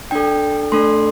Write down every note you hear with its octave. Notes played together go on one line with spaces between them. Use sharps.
D4 A4 G5
A3 D4 A4 C6